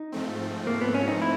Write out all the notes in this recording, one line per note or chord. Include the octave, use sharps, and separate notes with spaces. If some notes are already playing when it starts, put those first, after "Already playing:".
Already playing: D#4
G#2 F3 A3 C4
A#3
B3
C#4
D#4
E4